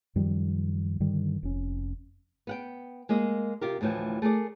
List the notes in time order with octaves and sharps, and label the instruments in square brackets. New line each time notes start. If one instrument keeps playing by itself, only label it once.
[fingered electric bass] F#2 D#3 F3 G3
G2 D3 D#3 G3
F1 C#4
[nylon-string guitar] B3 F#5 G5
G#3 A#3 D#5
C3 F4 G4 A#4
D2 A2 E3 F3 G5
A3 G#4 A#4 D5